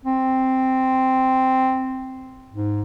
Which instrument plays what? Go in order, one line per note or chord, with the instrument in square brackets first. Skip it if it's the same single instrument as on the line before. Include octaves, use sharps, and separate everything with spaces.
[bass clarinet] C4
G#2